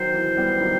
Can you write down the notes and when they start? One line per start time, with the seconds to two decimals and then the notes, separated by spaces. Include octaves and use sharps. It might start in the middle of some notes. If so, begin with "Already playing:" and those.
Already playing: D#3 F#3 C5
0.14 E3
0.37 G3 B3
0.61 D#3 F#3